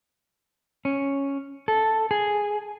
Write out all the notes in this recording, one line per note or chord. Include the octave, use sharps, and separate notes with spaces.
C#4
A4
G#4